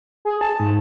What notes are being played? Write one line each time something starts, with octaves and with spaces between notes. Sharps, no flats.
G#4
A5
G#2